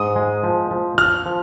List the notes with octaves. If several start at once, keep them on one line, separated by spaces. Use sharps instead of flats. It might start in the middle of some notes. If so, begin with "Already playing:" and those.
Already playing: G#2 D#6
G#3
F3
F3
F3 F6
F3